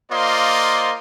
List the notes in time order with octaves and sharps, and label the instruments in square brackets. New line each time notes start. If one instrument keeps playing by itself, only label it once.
[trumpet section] A#3 F4 C5 D5 D#5 C6